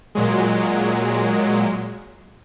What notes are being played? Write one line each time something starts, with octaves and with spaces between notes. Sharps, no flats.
A#2 F#3 G#3